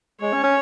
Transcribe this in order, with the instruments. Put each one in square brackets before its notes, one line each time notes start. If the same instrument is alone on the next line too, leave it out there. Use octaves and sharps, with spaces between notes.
[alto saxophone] G#3 [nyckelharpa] C#5
[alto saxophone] C#4
C#4